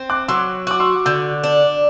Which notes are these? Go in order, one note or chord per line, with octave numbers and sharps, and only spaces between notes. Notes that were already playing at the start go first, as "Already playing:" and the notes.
Already playing: C4
D6 F#6
F#3 C6 E6
F#4 D6
C6 E6
D3 E6 G6
D4